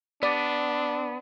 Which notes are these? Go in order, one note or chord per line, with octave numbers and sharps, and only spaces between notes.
B3 D4 D5